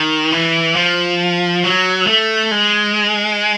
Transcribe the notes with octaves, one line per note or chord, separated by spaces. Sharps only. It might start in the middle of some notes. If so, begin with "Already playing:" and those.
Already playing: D#3
E3
F3
F#3
A3
G#3